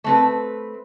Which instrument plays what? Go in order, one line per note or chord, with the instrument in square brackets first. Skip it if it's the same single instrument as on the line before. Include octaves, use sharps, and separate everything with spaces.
[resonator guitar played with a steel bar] A3 C4 B4